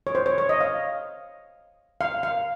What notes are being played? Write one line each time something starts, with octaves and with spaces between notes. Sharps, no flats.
C#5
C5
C#5
C#5
D#5
F5
F5
F5